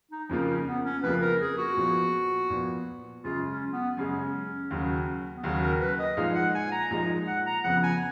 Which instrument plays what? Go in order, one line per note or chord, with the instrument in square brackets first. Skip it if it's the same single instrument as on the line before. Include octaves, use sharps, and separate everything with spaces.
[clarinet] D#4
[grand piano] F2 C#3 F3 A#3 F4 [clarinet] D#4
[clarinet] C#4
B3
C#4
[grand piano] F2 C#3 F3 A#3 F4 [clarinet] B4
[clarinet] A#4
G#4
F#4
[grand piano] A#2 F3 B3
A#2 F3 B3
[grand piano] F#2 C#3 G#3 [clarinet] F4
[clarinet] C#4
B3
[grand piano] F#2 C#3 G#3 [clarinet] C#4
[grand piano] D#2 C#3 F#3
[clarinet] B3
[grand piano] D#2 C#3 F#3 [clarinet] C#4
[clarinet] A#4
B4
D#5
[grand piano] A#2 F3 G#3 D#4 [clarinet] F5
[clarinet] F#5
G#5
A#5
[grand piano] A#2 F3 G#3 D#4 [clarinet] A#5
[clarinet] F#5
A#5
[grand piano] F2 C#3 F3 B3 [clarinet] F#5
[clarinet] G#5